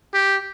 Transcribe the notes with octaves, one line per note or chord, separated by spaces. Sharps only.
G4